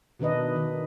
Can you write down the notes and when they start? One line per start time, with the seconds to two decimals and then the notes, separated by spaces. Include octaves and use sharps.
0.19 B2 D#3 D4 B4 D#5
0.56 D#3